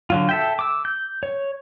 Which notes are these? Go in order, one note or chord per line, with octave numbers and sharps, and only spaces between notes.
D3 F#3 F4
A4 E5 G5
D6 E6
G6
C#5